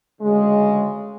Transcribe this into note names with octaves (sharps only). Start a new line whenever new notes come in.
D2 C#3 G#3